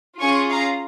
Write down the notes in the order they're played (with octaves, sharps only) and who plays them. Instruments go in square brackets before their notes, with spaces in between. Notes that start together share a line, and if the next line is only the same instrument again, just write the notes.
[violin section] C#4 F4 G#4 G#5 C#6
F5 A#5